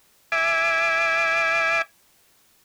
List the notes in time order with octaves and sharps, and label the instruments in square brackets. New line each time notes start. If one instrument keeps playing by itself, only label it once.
[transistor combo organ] E5 G#5 D6